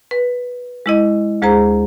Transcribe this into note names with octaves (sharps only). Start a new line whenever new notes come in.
B4
G#3 E4 D#5
D2 G#3 G#4 C5 A#5